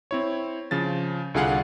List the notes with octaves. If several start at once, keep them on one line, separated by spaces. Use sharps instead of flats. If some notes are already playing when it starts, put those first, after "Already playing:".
C4 E4 C#5
C#3 F3 A6
C2 D3 F4 G#4 F5 F#5